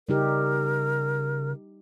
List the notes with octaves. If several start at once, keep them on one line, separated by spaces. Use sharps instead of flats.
C#3 G3 D#4 G4 A#4